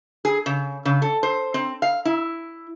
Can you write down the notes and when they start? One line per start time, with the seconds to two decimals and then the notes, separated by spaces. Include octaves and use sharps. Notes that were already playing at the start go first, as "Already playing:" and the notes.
0.25 G#4
0.46 C#3
0.85 C#3
1.02 A4
1.23 C5
1.54 C4
1.82 F5
2.05 E4